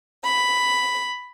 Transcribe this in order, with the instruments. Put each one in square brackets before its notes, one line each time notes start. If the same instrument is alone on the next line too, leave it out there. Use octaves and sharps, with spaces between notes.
[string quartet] B5